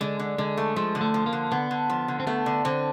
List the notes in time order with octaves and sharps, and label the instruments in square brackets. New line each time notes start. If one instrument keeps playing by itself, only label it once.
[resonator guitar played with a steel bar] D3 [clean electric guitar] G#3
[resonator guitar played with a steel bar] D3
[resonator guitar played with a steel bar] D3 [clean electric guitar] G#3
[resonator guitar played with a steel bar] A3
[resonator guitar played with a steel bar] F3 [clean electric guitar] G#3
[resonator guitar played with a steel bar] D3
[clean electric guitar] A3
[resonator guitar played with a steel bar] F3
[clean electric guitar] A#3
[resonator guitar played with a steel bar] D3
[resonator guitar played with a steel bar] D3 [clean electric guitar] B3
[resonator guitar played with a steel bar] D3
F3
D3
[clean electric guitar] C4
[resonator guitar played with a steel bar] A3 [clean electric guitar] B3
[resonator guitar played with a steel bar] D3
[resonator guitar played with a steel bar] D3 [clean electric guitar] C4